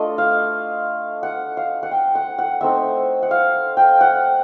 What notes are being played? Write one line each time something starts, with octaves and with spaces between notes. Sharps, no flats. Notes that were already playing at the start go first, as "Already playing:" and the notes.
Already playing: A3 D4 F4 D#5
F5
F#5
F5
F#5
G5
F#5
F#5
A3 C4 D#4 E5
F#5
F5
G5
F#5